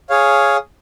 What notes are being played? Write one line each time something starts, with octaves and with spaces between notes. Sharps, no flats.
G#4 C#5 F5